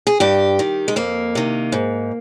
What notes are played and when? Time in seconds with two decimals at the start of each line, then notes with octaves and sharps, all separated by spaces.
0.07 G#4
0.20 G2 G4
0.59 D#3
0.88 G#3
0.96 F2 A#3
1.35 C3 D#3
1.72 G#2